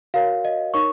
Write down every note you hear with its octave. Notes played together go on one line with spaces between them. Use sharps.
F#4 A#4 C#5 F5
D#5
D#4 A#4 C#5 C#6